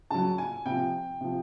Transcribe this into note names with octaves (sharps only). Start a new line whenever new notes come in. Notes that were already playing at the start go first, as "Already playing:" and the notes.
C#3 F#3 A5
G#5
C3 F3 G5
C3 F3